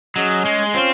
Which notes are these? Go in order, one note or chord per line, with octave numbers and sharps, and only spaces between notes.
F#3 C#4 G#4 D#5
G#3
C4 C#4 F4 C5